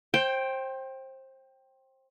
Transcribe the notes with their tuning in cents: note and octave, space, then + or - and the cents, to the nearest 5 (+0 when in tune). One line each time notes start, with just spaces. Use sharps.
C5 +25 G5 +0